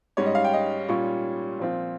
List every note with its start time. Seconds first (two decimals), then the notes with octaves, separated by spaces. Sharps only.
0.17 G#2 G3 C#4 C#5
0.26 D#5
0.35 F5
0.44 G5
0.53 D#5
0.88 A#2 G3 C#4 F4 C#6
1.59 A#2 F3 C4 F4